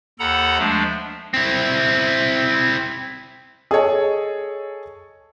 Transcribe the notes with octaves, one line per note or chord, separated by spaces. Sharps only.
D#2 A4 F#5 A#5 B5
F3 G#3 A3 D4
C4 E4
G#4 A4 C#5 D#5